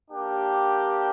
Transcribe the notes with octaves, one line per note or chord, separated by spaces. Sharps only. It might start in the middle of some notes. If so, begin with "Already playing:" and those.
A#3 D4 G4